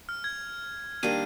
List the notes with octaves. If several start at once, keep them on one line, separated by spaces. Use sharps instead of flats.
F6
G#6
D#3 G3 A#3 D4 D#7